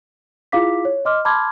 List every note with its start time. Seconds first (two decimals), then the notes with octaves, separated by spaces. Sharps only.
0.52 E4 F4 G#4 F5 D6 B6
0.85 C#5
1.05 D#5 C6 D6 F6
1.25 A5 B5 C6 D6 F6 G#6